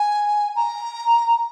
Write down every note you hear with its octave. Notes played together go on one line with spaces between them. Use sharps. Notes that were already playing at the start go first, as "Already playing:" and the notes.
Already playing: G#5
A#5